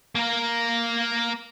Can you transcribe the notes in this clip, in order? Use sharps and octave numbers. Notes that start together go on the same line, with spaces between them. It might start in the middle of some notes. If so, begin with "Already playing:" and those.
A#3 A#4